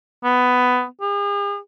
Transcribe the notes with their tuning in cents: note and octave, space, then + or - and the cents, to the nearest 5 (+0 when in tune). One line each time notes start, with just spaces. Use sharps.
B3 +15
G#4 -45